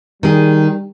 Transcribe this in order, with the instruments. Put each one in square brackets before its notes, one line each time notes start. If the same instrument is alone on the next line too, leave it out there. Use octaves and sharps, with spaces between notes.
[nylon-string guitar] D#3 G#4 [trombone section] G3